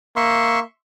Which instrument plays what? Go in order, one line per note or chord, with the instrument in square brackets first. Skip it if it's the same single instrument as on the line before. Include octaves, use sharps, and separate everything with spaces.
[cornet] A#3 [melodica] E5 C6 C#6